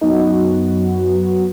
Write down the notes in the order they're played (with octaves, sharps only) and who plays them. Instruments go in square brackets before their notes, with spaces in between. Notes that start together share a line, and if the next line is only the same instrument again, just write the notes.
[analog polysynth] F#2 F#3 B3 F#4 [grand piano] D#4